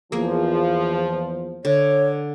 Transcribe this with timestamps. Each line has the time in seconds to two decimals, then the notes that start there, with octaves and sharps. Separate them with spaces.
0.12 E2 F3 A#3 G#4
1.65 D3 C#5